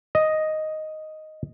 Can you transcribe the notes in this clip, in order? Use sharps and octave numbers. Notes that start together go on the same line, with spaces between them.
D#5